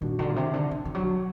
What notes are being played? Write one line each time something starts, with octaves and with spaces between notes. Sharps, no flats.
A#2 D#3 G3 D4 F#4
D3
A#2
C3
D3
D3
D#3
F#3